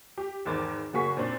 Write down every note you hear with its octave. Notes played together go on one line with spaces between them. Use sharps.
G4
G#1 E2 D#3 D6 A6
F#1 A#3 F#4 G#4 C#6 B6
A#2 C4 D4